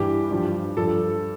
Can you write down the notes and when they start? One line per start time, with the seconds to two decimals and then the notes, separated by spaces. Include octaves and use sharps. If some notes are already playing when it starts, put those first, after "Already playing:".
Already playing: G2 E3 G4
0.31 G2 F3
0.77 G2 F3 A4